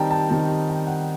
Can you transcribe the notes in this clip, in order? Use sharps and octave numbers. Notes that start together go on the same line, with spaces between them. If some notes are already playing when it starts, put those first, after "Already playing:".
Already playing: D#3 G3 C4 D#4 G5 A5 A#5
A5
D#3 G3 C4 D#4 A5
A5
G5
F#5